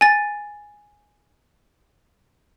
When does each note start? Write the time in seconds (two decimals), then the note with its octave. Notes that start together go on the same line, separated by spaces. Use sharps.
0.01 G#5 A6